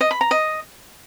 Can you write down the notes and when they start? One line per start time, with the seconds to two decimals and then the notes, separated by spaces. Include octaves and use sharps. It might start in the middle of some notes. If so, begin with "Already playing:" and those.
0.01 D#5
0.11 B5
0.21 A#5
0.31 D#5